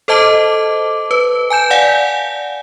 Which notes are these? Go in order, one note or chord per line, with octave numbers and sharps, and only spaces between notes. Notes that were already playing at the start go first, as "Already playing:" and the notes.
A4 C5 D#5 A5 D6
B4
G#5 A5 G6 E7
D5 F5 F#5 G#5